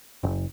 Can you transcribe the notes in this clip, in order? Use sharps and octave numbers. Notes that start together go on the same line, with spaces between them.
F#1